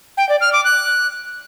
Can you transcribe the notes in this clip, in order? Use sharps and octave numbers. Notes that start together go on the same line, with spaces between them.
G5
D5
F6
D6
F#6